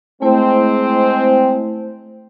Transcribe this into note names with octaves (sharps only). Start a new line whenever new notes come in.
G#3 A3 C4 E4 C5